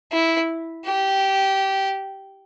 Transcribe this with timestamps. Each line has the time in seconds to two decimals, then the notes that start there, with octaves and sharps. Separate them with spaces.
0.12 E4
0.85 G4